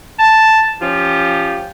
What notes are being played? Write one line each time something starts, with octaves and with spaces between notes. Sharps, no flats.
A5
F3 C#4 F4 G4